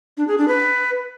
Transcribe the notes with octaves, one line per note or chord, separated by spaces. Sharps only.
D4
G#4
D4
B4